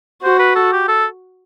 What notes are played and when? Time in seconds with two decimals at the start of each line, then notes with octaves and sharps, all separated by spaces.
0.23 F#4 C5
0.39 B4
0.56 A4
0.72 G4
0.88 A4